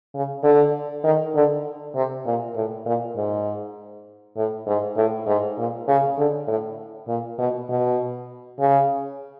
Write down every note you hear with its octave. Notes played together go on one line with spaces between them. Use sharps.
C#3
D3
D#3
D3
C3
A#2
A2
A#2
G#2
A2
G#2
A2
G#2
A#2
C#3
D3
A2
A#2
B2
B2
C#3